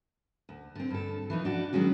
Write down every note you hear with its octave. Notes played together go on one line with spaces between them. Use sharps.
D2
D3 C4
G2 A4
E3 F3 D#4
D4 F#4
D#3 F#3 G#3 C#4 F#4